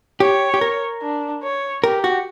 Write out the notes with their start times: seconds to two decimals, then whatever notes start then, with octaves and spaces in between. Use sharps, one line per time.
0.20 G4 C#5
0.54 G4
0.61 A#4
1.02 D4
1.43 C#5
1.84 G4 A#4
2.04 F#4